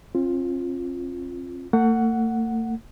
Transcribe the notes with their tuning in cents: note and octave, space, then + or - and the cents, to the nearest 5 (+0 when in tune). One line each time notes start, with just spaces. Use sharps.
C4 +45 F4 +0
A3 +45 F#5 +0